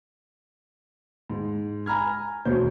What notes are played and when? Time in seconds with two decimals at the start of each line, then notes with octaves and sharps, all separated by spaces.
1.30 G#2
1.86 G#5 A#5 B5 F6 G#6
2.45 E1 D2 B2 C5 C#5 G6